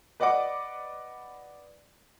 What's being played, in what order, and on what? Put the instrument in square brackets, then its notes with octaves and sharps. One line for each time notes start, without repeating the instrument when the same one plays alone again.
[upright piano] B4 D5 D#5 F#5 D6